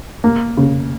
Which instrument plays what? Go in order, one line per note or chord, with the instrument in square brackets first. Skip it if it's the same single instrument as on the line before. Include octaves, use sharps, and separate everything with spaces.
[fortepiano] A#3
C#3